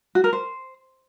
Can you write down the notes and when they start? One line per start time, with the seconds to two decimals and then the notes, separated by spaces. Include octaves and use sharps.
0.15 F#4
0.24 A#4
0.33 C5